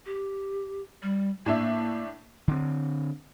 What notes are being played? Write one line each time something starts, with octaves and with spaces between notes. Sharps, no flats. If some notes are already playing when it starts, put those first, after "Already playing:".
G4
G3
A2 A#3 D4 E5
D3 C4